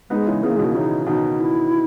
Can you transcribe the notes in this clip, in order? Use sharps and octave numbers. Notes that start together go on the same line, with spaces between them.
G#3 B3 D#4
C#3 E3
C#3 E3 B3
A#3
B2 D#3 G#3
A#3
C#3 E3 D#4
B2 D#3 D#4
E4